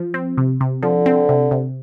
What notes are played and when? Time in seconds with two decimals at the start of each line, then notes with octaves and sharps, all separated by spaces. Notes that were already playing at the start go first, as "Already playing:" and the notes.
Already playing: F3
0.14 C4
0.38 C3
0.61 C3
0.83 D3 F3
1.06 C4
1.29 C3
1.51 C3